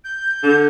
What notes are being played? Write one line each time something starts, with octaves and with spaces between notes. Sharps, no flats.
G6
D3